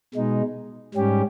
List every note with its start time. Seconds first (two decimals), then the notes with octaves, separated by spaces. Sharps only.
0.14 B2 G#3 D#4
0.94 G#2 G3 C#4 G4